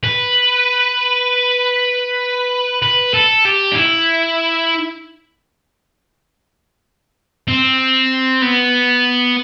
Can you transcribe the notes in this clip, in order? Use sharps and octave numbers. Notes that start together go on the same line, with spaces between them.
B4
B4
A4
G4
D4
E4
C4
B3